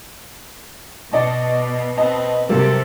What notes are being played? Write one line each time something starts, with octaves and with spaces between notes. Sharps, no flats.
B2 D5 D#5 A5
C4 B4 D#5 A5
C3 F#3 G3 A#3 A4